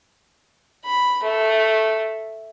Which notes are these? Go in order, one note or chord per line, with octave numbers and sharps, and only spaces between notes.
B5
A3